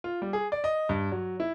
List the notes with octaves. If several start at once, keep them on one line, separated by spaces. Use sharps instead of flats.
F4
G3
G#4
D5
D#5
G2
F#3
E4